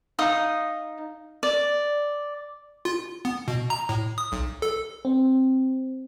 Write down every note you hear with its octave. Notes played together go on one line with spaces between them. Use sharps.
D#4 F5 D#6
D5
F4
B3
B2
A#5
A2
D#6
B1
A4
C4